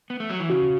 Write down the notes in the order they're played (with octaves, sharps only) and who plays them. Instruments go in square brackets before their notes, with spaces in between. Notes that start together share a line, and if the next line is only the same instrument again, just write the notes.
[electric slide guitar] B3
A3
F#3
E3
[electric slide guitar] C#3 [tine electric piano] F#4